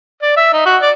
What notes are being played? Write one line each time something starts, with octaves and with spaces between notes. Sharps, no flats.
D5
E5
D#4
F#4
D5